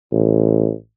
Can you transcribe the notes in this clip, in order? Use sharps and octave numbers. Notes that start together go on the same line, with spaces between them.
A1